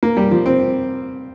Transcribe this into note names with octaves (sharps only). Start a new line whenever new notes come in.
A#3
G3
F3
C4